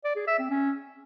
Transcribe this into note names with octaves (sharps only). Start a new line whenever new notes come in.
D5
G#4
E5
C4
C#4